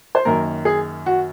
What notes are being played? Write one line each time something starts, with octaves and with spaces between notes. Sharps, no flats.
C5
F#2 D#3 A#3 A#4
G#4
F#4